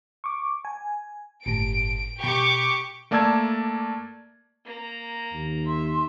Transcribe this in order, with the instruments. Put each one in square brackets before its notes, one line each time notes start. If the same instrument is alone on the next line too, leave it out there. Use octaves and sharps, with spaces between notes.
[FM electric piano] C#6 D6
G#5
[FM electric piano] G1 A2 [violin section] D7
[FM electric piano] B2 [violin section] G4 C#6 D6
[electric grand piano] A3 A#3 D5 A5 E6 G#6
[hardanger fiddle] A#3 A#5
[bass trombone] D#2
[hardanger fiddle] E5 [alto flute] C6